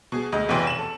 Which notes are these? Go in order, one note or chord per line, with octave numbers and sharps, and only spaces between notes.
B2 G#4
D2 G#3 D#5
F1 B1 B2 E3 G5 C6
E7 F#7
A4